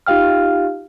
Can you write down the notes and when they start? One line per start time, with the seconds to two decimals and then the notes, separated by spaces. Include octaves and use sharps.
0.07 D#4 F4 G4 F5 G5 F6